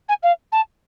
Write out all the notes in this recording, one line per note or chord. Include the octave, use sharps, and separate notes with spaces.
G#5
F5
A5